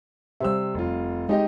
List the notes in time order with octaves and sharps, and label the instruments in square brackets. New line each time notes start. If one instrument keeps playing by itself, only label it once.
[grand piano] C3 E6 [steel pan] G3 C5 E5
[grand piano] F1 F4
[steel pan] G#3 C#5 [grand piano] D#4 G4 D#5